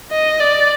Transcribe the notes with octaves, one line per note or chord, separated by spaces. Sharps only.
D#5
D5